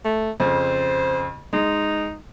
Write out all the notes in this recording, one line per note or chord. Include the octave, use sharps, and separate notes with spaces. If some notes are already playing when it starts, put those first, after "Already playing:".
A3
F2 C#3 C5
G#3 D#4